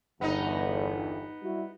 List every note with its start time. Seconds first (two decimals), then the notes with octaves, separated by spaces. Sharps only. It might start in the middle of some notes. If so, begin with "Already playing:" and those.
0.21 G1 E2 B3 D#4
1.43 G3 E4 F#4